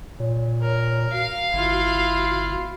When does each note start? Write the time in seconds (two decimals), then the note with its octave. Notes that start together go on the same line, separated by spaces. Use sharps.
0.20 A#2 C#5
0.62 A#4
1.13 F#4 F5
1.53 G1 E4 F4